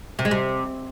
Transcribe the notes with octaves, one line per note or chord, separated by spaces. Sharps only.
C3
G#3
C3